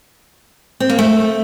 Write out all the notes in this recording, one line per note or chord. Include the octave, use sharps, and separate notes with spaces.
C4
A#3
A3